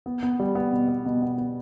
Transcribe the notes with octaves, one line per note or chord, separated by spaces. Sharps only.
B3
B3
G3
B3
B2
B3
B2
B3
B3